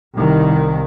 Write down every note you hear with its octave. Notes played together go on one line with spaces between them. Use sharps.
C2 D#3